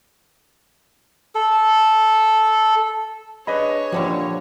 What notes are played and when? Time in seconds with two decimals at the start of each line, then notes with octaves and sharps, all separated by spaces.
1.35 A4
3.47 D4 G#4 B4 C#5 D#5 B5
3.92 A#2 D3 F3 G3